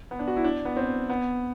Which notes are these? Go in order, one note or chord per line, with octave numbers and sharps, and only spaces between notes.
B3
D4
F#4
E4
D4
B3
C4
B3